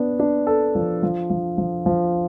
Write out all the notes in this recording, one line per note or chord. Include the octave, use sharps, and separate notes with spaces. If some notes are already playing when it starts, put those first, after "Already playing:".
Already playing: B3 D4
D4
A4
F3
F3
F3
F3
F3